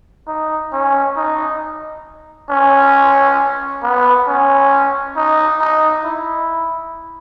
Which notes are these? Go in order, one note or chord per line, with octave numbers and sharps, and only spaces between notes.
D#4
C#4
D#4
C#4
B3
C#4
D#4
D#4
E4